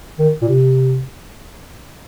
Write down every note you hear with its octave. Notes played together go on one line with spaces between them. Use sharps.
D#3
A#2
C3